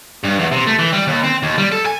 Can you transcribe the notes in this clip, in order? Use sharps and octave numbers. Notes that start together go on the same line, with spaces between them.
G2
E2
C3
A3
E3
G3
D#2
C4
D#2
G3
A4
G#5